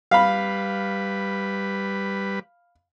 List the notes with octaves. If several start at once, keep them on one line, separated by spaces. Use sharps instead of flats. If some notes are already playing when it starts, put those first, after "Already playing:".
G3 B4 F5 B5